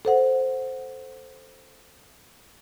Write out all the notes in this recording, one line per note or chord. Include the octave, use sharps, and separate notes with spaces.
A4 C5 F#5